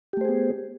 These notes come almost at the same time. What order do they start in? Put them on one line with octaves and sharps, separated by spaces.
G4 A3 C5 G#4 B3